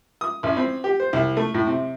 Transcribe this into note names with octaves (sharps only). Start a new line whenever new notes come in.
D#6
A1
C4
G4
C5
C2
A3
A2
C3